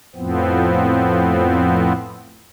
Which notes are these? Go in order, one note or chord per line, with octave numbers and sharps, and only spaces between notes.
F2 A2 F3 B3 C4